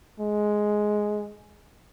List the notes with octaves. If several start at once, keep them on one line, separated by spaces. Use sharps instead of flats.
G#3